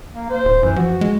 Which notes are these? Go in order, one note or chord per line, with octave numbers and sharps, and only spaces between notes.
A#3
C5
D1
F#2 E3
F3 F#4
G#3